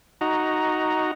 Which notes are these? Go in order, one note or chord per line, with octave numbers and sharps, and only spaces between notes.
D#4 F#4 A#5